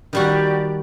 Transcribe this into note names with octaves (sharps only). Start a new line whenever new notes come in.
D#3 G3 F#4 G4 D5